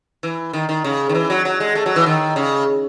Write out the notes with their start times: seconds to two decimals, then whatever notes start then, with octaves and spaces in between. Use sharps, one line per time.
0.23 E3
0.53 D#3
0.69 D#3
0.84 C#3
1.09 D#3
1.15 E3
1.30 F#3
1.45 F#3
1.60 G#3
1.75 A3
1.86 F#3
1.96 E3
2.06 D#3
2.36 C#3